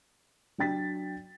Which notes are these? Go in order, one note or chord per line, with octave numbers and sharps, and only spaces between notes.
F#3 D4 G5 A6 B6